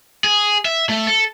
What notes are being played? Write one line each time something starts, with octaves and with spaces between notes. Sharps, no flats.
G#4
E5
A3
A4